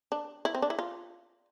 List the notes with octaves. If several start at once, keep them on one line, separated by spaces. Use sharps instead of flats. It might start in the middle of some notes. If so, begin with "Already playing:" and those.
D4
E4
C4
D4
E4
F4